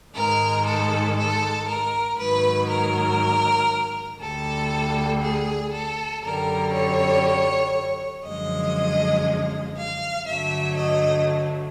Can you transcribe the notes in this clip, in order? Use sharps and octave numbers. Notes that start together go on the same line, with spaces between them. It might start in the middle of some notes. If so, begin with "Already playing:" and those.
G#2 D#3 G#3 A#4
A4
A4
A#4
G#2 D#3 F#3 B4
A#4
D2 D3 G3 A4
G#4
A4
F#2 D3 G3 A#4
C#5
F#2 D3 F3 G#3 D#5
F5
G2 D3 F#3 A3 E5
D#5